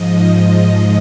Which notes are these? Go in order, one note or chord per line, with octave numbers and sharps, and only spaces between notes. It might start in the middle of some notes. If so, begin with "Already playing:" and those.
Already playing: G#2 F3 D#5